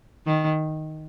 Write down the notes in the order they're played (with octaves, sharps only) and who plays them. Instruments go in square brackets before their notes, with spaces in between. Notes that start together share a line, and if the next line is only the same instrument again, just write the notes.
[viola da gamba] D#3